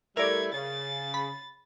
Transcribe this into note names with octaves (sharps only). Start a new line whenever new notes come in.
G3 A3 E4 A#4 D5 G#6
C#3 A6
B5